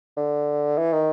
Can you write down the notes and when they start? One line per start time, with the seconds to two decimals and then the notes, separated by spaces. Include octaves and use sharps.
0.17 D3
0.78 E3
0.93 D#3